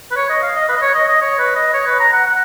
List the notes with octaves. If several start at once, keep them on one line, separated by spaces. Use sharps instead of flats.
B4
C#5
D#5
F5
D#5
B4
D#5
C#5
D#5
D#5
C#5
B4
D#5
C#5
B4
A#5
F#5
F#5